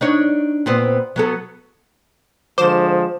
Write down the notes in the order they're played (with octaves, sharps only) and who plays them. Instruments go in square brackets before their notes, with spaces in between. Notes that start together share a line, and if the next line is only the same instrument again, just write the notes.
[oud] D4 D#4 C#5
A#2 B3 C4
F#3 B3 A4
[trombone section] D3 F3 G#3 [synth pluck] C5 D6 E7